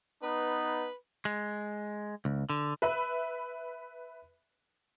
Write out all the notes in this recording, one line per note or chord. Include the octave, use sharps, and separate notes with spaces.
B3 D#4 B4
G#3
C#2
D3
B4 E5 B5